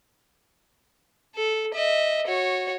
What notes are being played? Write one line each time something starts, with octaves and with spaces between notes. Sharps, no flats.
A4
D#5 E5
F#4 C#5